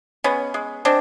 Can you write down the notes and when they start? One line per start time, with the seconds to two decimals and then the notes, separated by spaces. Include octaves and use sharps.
0.24 G#3 B3 C#4
0.54 G#3
0.85 G#3 C4 D4